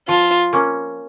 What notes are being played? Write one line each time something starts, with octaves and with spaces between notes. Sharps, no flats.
F3 F4
A#3 C#4